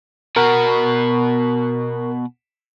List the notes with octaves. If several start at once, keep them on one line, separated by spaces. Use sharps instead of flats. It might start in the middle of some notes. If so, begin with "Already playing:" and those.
B2 F#4 A#4